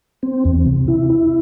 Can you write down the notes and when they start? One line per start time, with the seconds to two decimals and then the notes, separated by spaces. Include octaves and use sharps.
0.23 C4
0.45 E2
0.66 C3
0.88 E4
1.10 E4